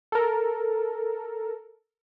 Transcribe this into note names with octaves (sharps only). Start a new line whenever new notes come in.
A4 A#4